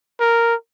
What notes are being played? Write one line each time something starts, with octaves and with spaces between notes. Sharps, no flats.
A#4